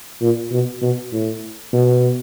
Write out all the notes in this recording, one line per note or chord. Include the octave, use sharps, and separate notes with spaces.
A#2
B2
B2
A2
B2